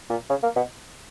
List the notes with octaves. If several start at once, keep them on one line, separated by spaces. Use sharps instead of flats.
A#2
C#3
A#3
B2